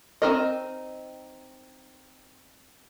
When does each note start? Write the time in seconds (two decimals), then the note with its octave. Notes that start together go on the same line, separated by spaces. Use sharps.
0.22 C4 D#4 A#4 D#5